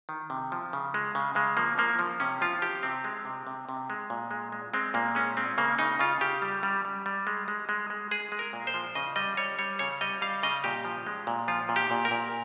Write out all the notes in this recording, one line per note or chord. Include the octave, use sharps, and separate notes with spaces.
D#3
C3
F3
C#3
G#3
C#3
C#3 G#3
F3 A#3
F3 A#3
F3
C3 C#4
F3 F4
F3 G4
C3 C4
G#3
C3
C3
C3
G#3
A#2
G#3
G#3
G#3 C4
A#2 A#3
G#3 C#4
G#3 C4
C#3 A#3
C#3 D#4
C#3 F4
C#3 G4
G3
G3
G3
G3
G#3
G#3
G#3
G#3
G#3 G#4
G#3
A#4
A#2
C5
F3
C#3 D#5
G3 D#5
G3 C#5
G3 C#5
C#3 C#5
G3 D#5
G3 F5
C#3 D#5
A#2 G4
F3
G#3
A#2
F3 F4
A#2
G4
A#2
A#4
A#2